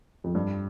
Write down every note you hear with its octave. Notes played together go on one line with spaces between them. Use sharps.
F2
G2